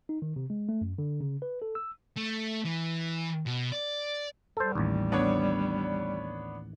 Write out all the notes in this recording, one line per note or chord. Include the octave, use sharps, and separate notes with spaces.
D#4
D#3
C3
G#3
A3
F#2
D3
C#3
B4
A4
E6
A3
E3
B2
D5
G3 A4 C5
A1 D#2
B3 D4 C#5